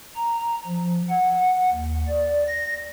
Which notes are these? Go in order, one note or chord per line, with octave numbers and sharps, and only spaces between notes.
A#5
F3
F#5
D#2
D5
A#6